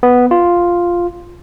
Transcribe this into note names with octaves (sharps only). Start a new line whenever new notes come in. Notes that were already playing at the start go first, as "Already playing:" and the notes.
B3
F4